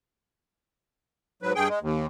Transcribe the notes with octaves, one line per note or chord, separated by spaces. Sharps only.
G#2 F#3 B4
G2 G#4 G5
G#3
D#2